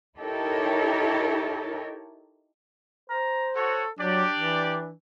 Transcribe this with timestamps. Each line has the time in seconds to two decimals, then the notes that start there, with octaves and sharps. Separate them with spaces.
0.18 D#4 E4 G4 A4 A#4 C#5
3.10 C5 A#5
3.56 F#4 A4 C#5
3.99 F#3 D4 G4 D5
4.39 E3